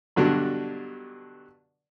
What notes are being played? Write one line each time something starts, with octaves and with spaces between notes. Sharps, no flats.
G2 B2 D3 F#3 D4